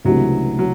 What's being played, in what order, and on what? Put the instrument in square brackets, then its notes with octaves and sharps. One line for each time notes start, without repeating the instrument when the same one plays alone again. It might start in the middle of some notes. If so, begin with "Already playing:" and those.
[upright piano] C#2 C3 E3 A3 D4 [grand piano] F#3
[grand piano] F#3